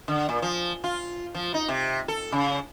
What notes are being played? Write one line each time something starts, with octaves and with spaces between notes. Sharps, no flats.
D3
A#2
F3
F4
F3
D#4
C3
A4
C#3